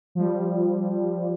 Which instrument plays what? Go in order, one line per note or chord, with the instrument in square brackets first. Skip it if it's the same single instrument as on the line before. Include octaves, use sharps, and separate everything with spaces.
[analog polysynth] F3 G3